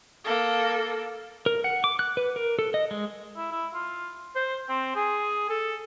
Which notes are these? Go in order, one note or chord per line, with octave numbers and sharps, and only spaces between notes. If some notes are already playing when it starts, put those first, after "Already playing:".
A#3 A4
A#4
F#5
D6
F#6
B4
A#4
A4
D#5
G#3
E4
E4
F4
C5
C4
G#4
A4